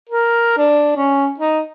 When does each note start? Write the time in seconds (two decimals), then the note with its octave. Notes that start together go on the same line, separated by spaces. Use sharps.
0.09 A#4
0.57 D4
0.97 C#4
1.40 D#4